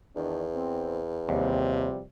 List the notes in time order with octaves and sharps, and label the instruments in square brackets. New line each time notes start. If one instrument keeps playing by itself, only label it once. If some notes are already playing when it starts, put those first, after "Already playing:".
[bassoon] E2 [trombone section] D#3 D4
[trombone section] C4
[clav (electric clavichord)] D#2 [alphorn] C3 [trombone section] F3 G3